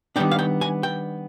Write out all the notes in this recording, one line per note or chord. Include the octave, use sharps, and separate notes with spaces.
D#3 G3 B3 D4 G5
F5
G5
G#5
G5